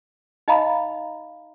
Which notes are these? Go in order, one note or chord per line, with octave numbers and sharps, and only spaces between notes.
D#4 D#5 F5 A#5 B5